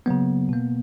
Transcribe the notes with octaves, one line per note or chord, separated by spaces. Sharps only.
C#3 F#3 A#3 B3
B2 A#3